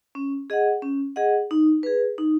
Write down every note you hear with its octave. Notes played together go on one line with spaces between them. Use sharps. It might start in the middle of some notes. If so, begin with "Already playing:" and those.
C#4
G#4 D#5 F#5
C#4
G#4 D#5 F#5
D#4
G#4 B4
D#4